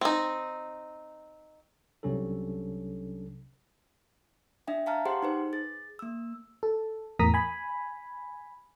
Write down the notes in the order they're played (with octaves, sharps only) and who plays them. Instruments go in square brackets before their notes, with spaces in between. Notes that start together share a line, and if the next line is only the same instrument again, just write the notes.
[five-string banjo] C4 D#4
[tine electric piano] C2 C3 F#3 C#4 D4 A4
[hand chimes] D4 E5 G5
F5 G5 A5 A#5 F6
G4 G#4 C5 F#5 G5 C6
D#4 B4 C5
G#4 A6
A#3 E6
[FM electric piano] A4
E2 A2 A#4 A#5 D#6 B6
G#5 B5